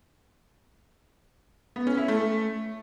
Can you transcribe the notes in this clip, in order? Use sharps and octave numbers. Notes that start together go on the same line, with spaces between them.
B3
C#4
E4
A3